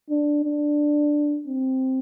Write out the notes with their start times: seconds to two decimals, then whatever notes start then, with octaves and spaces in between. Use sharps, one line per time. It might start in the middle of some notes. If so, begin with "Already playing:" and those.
0.10 D4
0.44 D4
1.47 C4